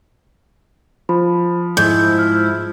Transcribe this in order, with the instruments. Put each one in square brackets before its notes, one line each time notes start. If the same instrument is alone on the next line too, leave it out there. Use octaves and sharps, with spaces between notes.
[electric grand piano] F3 [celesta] B5
[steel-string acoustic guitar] G#2 [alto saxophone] E4 [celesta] G6
[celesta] F6